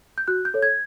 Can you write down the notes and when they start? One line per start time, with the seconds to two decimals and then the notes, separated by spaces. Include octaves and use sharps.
0.18 G6
0.28 F#4 F#6
0.45 G6
0.54 A4 C#5
0.62 G#6